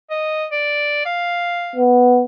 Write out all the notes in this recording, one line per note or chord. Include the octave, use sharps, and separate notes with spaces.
D#5
D5
F5
B3